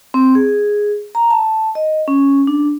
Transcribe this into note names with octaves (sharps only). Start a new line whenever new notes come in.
C4
G#4
A#5
A5
D#5
C#4
D4